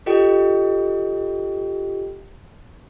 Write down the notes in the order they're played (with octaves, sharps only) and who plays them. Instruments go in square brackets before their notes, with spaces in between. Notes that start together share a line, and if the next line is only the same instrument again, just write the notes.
[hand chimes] F4 G4 A4 D#5 G5